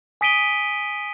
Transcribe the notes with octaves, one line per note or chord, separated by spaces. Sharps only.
G#5 D#6 B6 D7 D#7 G7